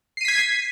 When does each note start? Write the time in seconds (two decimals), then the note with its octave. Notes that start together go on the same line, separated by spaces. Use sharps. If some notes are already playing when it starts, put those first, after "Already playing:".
0.17 C7
0.21 D#7
0.25 B6
0.28 G#6